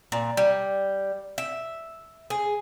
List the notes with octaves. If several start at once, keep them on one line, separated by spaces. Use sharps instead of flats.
A#2
G3
E5
G#4